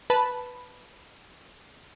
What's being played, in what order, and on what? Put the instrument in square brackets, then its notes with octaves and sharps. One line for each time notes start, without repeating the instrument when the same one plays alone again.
[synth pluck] B4 A5 B5